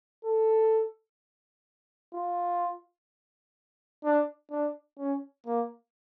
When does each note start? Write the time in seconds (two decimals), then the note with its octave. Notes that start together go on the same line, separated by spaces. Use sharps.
0.25 A4
2.13 F4
4.05 D4
4.51 D4
4.99 C#4
5.47 A#3